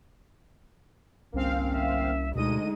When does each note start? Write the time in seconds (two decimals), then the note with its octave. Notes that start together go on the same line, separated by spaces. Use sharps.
1.34 G1 C2 A#3 C4 C#4 F5
1.75 E5
2.35 D2 B2 G#3 D#4 D#5 D#7